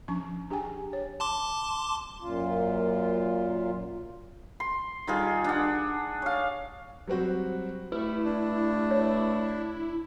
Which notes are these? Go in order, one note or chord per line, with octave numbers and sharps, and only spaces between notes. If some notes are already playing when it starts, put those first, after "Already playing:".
F3 C#4 D4 C#6
D4 G4 G#4 G5 G#5
C#5
A5 C6 D6
F#2 A#2 F4
C6
D#3 G3 F4 G#4
D4 F#5
C#5 F5
F#3 G3 C4 F#4 C5
G2 A3 E4 B4
D4
C#5